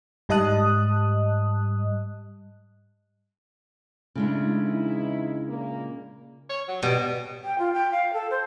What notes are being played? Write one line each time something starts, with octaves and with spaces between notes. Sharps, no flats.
G#2 G3 D#5 A5 D#6 F#6
C#3 G#3 A3 D4 E4
E2 D#4 E4
A#2 A#3
C#5
F#3
B2 G3
G5
F4
G5
F5
A4
C5